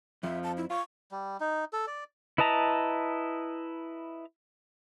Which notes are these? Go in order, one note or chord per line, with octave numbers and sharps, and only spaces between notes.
F2 F3 E5
A5
E4
F4 C#6
G3
D#4
A4
D5
E4 B4 D#5 A5 A#5